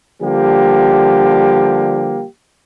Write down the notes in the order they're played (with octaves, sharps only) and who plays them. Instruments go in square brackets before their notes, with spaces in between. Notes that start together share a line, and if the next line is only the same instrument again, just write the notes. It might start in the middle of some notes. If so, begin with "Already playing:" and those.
[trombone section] D3 F3 G3 A#3 G4